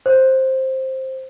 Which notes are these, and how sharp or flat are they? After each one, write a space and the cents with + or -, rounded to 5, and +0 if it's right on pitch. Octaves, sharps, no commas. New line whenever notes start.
C5 +10